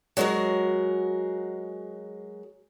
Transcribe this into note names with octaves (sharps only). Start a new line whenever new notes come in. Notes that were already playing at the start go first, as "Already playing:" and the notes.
F#3 G#3 F#4 G#4 A#4